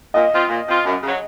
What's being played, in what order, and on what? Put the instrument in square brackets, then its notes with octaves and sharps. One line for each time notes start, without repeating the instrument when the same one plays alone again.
[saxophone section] A#2 [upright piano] D#5
[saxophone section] F3 C4 F4
A#2
F3 C4 F4
F#2
C#3 F#3